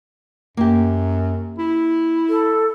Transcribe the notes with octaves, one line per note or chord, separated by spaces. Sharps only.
F#2 A#3 G4
E4
A4